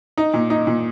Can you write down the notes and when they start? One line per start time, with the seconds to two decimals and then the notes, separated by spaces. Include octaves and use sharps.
0.17 D#4
0.34 A#2
0.50 D#4
0.67 A#2